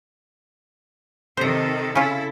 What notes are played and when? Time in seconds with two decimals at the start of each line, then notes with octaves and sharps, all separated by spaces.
1.37 C3 D#3 A4 C5 A#5
1.95 C#3 C#4 E4 F4 A4